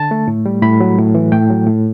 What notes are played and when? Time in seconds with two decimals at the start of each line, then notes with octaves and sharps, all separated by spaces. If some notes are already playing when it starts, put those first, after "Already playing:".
Already playing: D3 A5
0.11 A3
0.28 A2
0.46 G3
0.62 A2 B5
0.80 F#3
0.98 A2
1.15 E3
1.32 A2 G5
1.50 F#3
1.67 A2